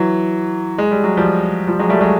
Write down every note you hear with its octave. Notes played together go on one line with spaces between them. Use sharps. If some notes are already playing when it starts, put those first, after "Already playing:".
Already playing: E3 F#3
G#3
G3
F#3
F3 G3
F3 G3
F#3 G#3
G3 A3
F#3 G#3